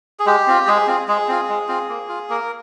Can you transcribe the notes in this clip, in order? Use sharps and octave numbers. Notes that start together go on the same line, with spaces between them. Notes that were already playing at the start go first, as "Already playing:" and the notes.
G#4
G#3 G4
C4 F4
G#3 G#4
C4 F4
G#3 G#4
C4 F4
G#3
C4 F4
A#3
F4
A#3 A#4